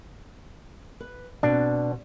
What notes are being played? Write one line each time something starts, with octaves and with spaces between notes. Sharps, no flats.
B4
B2 B3 C4 D4